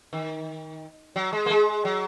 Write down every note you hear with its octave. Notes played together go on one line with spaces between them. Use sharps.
D#3
F#3
G#3
A#3
G#3
F#3